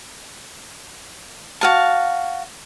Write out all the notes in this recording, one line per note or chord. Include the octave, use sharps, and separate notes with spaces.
F#4 F5 A5